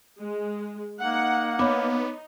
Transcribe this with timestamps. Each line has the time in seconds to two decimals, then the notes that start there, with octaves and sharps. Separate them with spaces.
0.19 G#3
1.01 A#3 D#4 F#5
1.59 B3 D#4 C#5 B5 D6